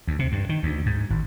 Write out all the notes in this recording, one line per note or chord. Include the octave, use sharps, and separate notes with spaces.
D2
C3
G2
D#3
D2
G#2
G#1